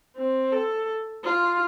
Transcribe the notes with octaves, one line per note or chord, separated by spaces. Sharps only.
C4
A4
F4